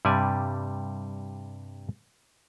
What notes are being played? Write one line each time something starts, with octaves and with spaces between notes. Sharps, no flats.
G2 C3 G3 D5 G#5